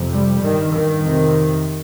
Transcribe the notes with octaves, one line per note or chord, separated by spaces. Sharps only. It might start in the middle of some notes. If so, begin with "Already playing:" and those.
Already playing: F2 C3
G3
G2 D#3
D#3
F2 C3